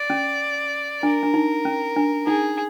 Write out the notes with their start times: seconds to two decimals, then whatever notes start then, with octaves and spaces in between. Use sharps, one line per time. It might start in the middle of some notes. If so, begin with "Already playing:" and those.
Already playing: D5
0.10 C#4
1.03 D4 A#4
1.23 D4
1.34 D#4
1.65 C#4
1.96 D4
2.27 D#4 G#4